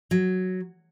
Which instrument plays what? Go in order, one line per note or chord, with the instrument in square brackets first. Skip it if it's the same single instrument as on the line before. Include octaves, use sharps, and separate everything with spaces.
[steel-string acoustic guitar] F#3